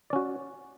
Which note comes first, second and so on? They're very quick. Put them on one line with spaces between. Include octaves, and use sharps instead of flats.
D5 C#4 F#4